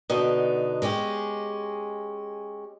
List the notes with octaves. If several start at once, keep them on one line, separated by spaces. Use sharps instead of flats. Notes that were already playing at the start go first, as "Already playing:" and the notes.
B2 D3 D#4
G#3 C#4 G4